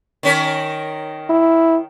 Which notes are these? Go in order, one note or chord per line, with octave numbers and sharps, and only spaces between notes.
D#3 C#4 A#4
E4